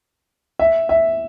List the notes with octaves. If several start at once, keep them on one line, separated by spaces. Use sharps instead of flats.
E5
E5